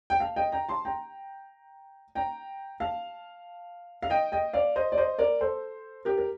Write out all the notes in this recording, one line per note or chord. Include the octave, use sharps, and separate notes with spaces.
G5
F5 A5
D#5 G5
G5 A#5
A5 C6
G5 A#5
G5 A#5
F5 A5
F5
D#5 G5
D#5 G5
D5 F5
C5 D#5
D5
C5 D#5
A#4 D5
A4 C5
G4 A#4
A#4